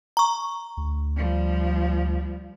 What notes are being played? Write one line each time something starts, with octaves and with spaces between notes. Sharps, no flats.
A#5 C#6
D2
F3 G3